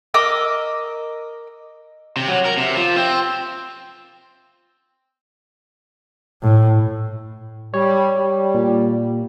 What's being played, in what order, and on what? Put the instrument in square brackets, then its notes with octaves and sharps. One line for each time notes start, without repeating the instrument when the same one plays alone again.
[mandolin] A#4 D#5 D6 E6
[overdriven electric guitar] C3
F#3
A#4
C3
F3
C4
[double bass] A2
[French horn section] G3 [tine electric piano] C#5
[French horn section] G3
[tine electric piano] A#2